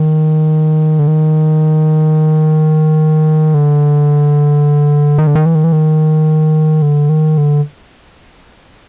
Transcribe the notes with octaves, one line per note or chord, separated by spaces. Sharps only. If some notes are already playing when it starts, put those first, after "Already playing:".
Already playing: D#3
D3
D#3
D3
D#3
D3
D#3
E3
D#3
E3
D#3
D3
D#3
D3